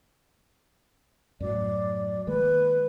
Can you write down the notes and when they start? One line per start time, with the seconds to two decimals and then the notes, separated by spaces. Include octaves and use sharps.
1.40 F#2 A2 F#3 D5
2.27 D#3 G#3 A#3 B4